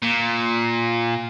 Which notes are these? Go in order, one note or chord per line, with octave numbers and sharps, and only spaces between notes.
A#2